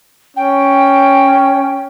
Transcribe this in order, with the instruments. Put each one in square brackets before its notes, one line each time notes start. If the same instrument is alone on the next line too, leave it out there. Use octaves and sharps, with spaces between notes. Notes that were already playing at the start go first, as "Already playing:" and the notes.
[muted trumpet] C#4 [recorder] G5